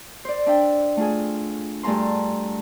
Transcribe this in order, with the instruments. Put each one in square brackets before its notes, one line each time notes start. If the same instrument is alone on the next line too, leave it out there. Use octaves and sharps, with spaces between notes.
[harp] C5 D5
D4 E5 G5
A3 F4 G#4
G2 A3 G#4 A5 A#5 C6